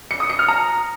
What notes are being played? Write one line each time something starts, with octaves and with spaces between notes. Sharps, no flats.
C#7
D#6
C#7
F6
A#5